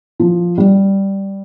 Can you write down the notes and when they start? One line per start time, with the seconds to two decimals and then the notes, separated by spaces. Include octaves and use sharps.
0.20 F3
0.58 G3